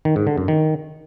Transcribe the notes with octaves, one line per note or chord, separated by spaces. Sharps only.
D#3
G#2
D3
F#2
D#3